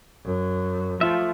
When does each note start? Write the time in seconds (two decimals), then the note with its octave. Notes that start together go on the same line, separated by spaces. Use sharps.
0.26 F#2
1.01 F3 A3 F4 E5